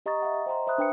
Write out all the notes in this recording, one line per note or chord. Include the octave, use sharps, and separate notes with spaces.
G4 D#5 A#5 C#6 D#6 A6
E5 F#5
D#5
C5 G5 A#5 C6
C5 E5 B5 D#6 F#6
D4 B4 G5 D#6 C#7